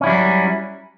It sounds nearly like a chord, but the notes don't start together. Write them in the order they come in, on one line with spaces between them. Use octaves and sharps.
C#4 E4 G3 F#3